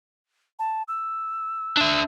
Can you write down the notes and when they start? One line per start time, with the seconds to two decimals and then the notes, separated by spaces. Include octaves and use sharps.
0.59 A5
0.88 E6
1.77 D4 E5